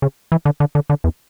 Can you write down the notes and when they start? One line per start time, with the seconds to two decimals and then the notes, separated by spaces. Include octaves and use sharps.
0.02 C#3
0.32 E3
0.45 D3
0.60 D3
0.75 D3
0.90 D3
1.04 E2